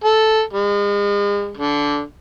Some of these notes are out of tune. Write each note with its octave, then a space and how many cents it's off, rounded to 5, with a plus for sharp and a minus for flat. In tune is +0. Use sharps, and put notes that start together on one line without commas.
A4 -5
G#3 -40
D3 -15